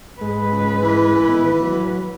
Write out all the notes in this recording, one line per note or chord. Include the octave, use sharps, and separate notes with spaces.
G#2 G#3 B4
C#2
E3
A2 D#3 B3
F#3